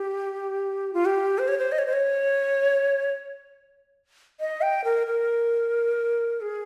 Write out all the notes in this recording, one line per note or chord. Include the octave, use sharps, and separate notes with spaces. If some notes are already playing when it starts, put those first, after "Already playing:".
Already playing: G4
F4
G4
C5
C#5
C5
D#5
C#5
C5
C#5
D#5
G5
A#4
A#4
G#4